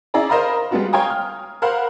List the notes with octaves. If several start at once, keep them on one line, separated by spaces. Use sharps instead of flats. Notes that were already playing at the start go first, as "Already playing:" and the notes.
C#4 E4 G#4 D5 A#5
A#4 C5 D#5 F5 A#5 B5
G3 G#3 B3 F4 F#4
C#5 F5 G5 G#5 A#5 D#6
F6
A#4 C5 F5 F#5 B5